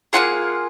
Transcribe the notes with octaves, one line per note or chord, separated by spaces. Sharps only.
A#3 D4 F4 G#4 F#5